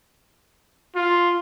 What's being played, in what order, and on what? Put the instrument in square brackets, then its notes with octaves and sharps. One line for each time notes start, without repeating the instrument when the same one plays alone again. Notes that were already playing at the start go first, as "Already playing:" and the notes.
[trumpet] F4